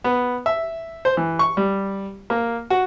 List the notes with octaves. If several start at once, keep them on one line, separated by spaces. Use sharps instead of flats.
B3
E5
C5
E3
C#6
G3
A#3
F#4